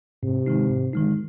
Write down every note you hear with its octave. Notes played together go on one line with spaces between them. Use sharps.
G#2 C3
D#3 G#3 D#4
G#2
D#3 G#3 D#4